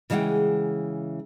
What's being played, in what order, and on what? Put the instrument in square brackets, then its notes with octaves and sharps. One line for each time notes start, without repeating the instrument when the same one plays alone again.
[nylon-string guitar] C#3 E3 G#3 E5 F#5 G5